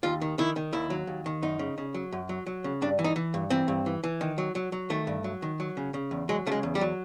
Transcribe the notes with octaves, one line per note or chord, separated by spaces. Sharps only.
D#2 F4
D#3
D#3 E4
D#3
D#2 E4
F#3
D#2
D#3
F#2 D#4
C#3
C#3
F#3
F#2
F#3
F#3
C#3
G2 D4
E3
D#4
E3
G2
E3 C4
G2
E3
E3
D#3
F#3
F#3
F#3
D#3 A3
G2
F#3
D#3
F#3
C#3
C#3
E2
F#3 G#3
C#3 A3
G#3
E2
G3
F#3